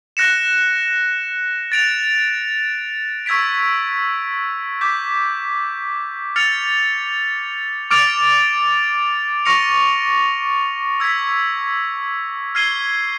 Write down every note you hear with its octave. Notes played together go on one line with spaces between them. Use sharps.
F#6 A#6 C#7 E7
A6 D7 F7
C#6 E6 G#6 B6 D7
D6 G6 B6
F6 A6 C#7 F7
D6 F6 A6 D7 F7
C#6 F6 A#6 C#7 F7
E6 G#6 B6
F6 G#6 C7 D#7 G7